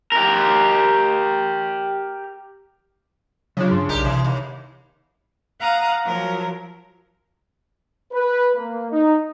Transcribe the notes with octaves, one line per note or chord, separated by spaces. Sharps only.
G4 A#4
C#3 F#3 D4 F4
G2 C6
B1 D#4 G4 A#4
C3 E3
D#2
F5 F#5 A#5 D#6
F3 F#3 A#4
B4
A#3
D#4